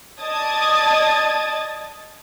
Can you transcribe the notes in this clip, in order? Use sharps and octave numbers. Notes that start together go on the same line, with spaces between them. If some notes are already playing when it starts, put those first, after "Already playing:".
D5 D#5 A5 D#6 G#6 A6